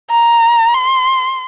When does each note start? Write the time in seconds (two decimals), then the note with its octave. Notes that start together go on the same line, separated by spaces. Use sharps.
0.11 A#5
0.74 C6